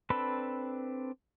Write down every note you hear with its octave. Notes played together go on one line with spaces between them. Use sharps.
C4 D4 A4 B4 B5